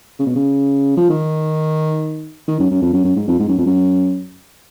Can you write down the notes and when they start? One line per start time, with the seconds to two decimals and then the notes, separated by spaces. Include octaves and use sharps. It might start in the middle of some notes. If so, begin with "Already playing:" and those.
0.19 C#3
0.26 B2
0.35 C#3
0.97 F3
1.10 D#3
2.47 D#3
2.59 F#2
2.71 F#2
2.82 F2
2.93 F#2
3.04 F#2
3.16 G#2
3.28 F2
3.39 G#2
3.48 F#2
3.58 F2
3.66 F#2